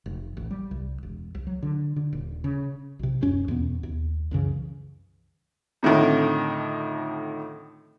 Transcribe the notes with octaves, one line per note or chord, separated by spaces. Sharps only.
F1
A1
G3
C2
E1
C2
F#3
D3
D3
D#1
C#3
B1 C3
D1 F#2 C#4
E2 B2 B3
D#2
C2 F#2 C#3 E3
F2 A2 D3 D#3